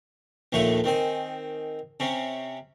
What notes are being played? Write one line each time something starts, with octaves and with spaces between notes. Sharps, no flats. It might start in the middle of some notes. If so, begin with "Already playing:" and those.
A#1 D#2 A#2 A3 C#5
D#3 C4 G#5
C3 C#4